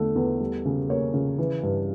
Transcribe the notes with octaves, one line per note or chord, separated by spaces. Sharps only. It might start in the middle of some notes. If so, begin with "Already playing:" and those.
Already playing: E2 D3 A3 A4
E2
G3
C#3
A#3 C#5
C#3
E3
G2